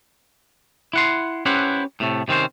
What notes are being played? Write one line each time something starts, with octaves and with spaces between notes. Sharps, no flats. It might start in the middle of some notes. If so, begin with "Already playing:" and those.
E4 F#5 C6
C#4 E4 G4 B4 C5 F#5
A2 C3 A3
C3 D#3 C4 C#4 C5